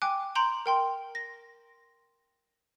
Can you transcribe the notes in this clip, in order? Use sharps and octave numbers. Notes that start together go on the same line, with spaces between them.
G5 G#5 D6 F#6
A#5 C6 G6 D7 F#7 G7
A#4 G5 C6
A#6